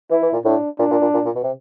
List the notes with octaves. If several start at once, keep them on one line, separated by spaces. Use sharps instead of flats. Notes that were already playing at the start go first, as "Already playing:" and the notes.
E3 E4
E3
A#2
A2 D4
A#2 D4
A#2
A#2
A#2
A#2
B2
C3